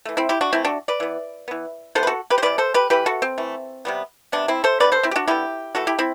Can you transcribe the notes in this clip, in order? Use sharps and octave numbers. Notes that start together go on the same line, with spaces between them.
E3 A3
C4 E4
E4 G4
D4 F#4
E3 A3 C4 E4
D4 F#4
B4 D5
E3 B3
E3 B3
C3 E3 B3 A4 C5
B4
F#4 A4
G4 B4
C5
C3 E3 B3 B4 D5
A4 C5
G4 B4
E3 A3 G4 B4
F#4 A4
C4
E3 A3
C3 G3 B3
C3 G3 B3 D4
C4 E4
A4 C5
D3 G3 B3 B4 D5
A4 C5
C4 E4
G4
D4 F#4
D3 G3 B3 E4 G4
E3 A3 F#4 A4
E4 G4
C4 E4